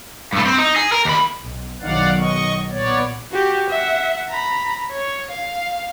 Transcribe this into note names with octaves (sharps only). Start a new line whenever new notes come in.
G2 A3
C4
D#4
G#4
A#4
D#2 B5
B1
B1 D#3 F#3 D5 F5 F#5
D#5 C#6
A#2 B3 C#5 D5
F#4 G4
E5 F#5
A#5 B5
C#5
F5